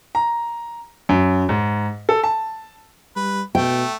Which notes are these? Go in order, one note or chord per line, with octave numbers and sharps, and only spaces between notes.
A#5
F#2
G#2
A4
A5
G3 B4
B2 A3 G5